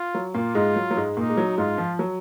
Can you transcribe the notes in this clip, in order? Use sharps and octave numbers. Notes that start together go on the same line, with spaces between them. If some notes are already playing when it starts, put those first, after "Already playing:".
Already playing: F4
F#3
A#2 A#3 F4
G#2 G#3
F#3
F#3
G#2 G#3
A#2 A#3 D#4
G#3
F#3
G#2 G#3 F4
F3
F#3